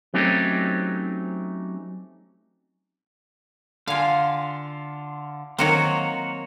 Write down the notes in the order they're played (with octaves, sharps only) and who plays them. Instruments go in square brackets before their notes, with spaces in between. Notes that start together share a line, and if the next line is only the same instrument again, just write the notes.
[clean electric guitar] F#3 A3 C4 C#4 D#4 G4
[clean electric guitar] D3 F4 [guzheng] F5 G#5
[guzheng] D#3 F#3 C4 [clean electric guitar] A#3 F#4 C#5